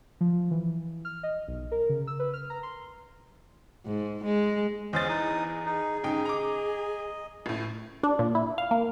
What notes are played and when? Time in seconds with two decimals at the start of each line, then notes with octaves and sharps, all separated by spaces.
0.21 F3
0.51 E3
1.05 F6
1.23 D#5
1.48 B1
1.72 A#4
1.89 C#3
2.07 E6
2.19 B4
2.33 F6
2.50 A#5
2.63 C6
3.86 G#2
4.24 G#3
4.93 E2 C#4 C5 D#5 A6
5.09 D#4 E4 D#6
5.66 D#4 G#4
6.04 G#2 C#3 D#5 G5
6.25 A#5 D6
7.46 A1 A2
8.03 D4
8.19 A#2
8.35 E4
8.58 F5
8.71 A#3